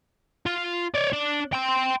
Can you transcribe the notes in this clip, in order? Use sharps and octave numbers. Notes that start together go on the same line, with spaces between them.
F4
C#5 D5
D4 D5
G5 C6